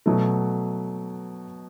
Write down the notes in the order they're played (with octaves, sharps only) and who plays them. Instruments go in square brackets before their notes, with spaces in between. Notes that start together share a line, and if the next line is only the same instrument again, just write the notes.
[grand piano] B2 F#3 A3